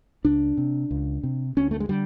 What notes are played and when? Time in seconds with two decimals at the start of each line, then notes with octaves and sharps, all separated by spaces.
0.25 C#2 D4
0.57 C3
0.91 C#2
1.23 C3
1.57 D2 C#4
1.71 A3
1.80 G#3
1.89 D3 G3